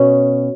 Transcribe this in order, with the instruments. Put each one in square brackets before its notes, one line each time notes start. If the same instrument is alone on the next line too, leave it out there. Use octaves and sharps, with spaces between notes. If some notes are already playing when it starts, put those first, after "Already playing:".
Already playing: [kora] B2 C#4